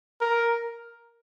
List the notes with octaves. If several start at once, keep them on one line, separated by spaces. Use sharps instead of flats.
A#4